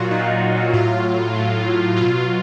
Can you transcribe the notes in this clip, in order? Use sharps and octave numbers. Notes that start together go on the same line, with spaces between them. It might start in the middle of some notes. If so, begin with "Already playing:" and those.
Already playing: A#2 F#3 F4 F#4
A#2 F#3 D#4
A2 F#3 F4
A2 F#3
B2 F#3 F4